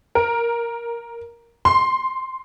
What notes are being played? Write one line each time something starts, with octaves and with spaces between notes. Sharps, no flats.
A#4
C6